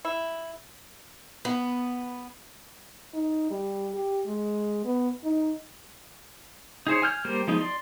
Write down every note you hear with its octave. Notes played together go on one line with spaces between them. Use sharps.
E4
B3
D#4
G3
G4
G#3
B3
D#4
D#4 G#4 C5 C#5
G#5 F6 G6
G3 A#3 G4 C5
F3 G#3 B3 D#4
D5 C6